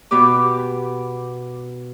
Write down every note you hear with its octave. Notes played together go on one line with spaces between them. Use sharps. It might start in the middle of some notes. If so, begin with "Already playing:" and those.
B2 B3 G4 D6